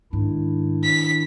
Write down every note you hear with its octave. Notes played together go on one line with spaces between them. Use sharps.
G#2 D#3 D4 E4
B6